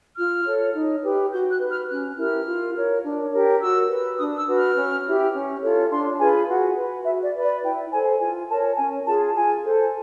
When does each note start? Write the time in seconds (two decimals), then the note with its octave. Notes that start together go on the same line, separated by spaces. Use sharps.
0.17 F4 F6
0.46 A4 C#5
0.74 D#4
1.03 G4 B4
1.32 F#4 G6
1.50 F#6
1.60 B4
1.70 F6
1.89 C#4 F#6
2.17 E4 G4 A#4 F6
2.46 F4
2.75 A#4 C#5
3.03 D4
3.32 G4 A#4 C#5
3.61 F#4 E6
3.90 B4
4.18 D4 D#6
4.37 E6
4.47 F#4 B4
4.56 F6
4.76 C#4
5.05 E4 G4
5.33 C#4
5.62 F4 A4 C#5
5.90 D4 C6
6.19 F4 G#4 B4 G#5
6.47 F#4 F#5
6.76 B4
7.04 F#4 E5
7.23 D5
7.34 B4
7.44 D5
7.62 E4 G5
7.91 A4 C5 G#5
8.20 F4 G#5
8.48 A#4 C#5 A5
8.76 C#4 G#5
9.06 F4 G#4 A5
9.34 F4 G#5
9.62 A4 C5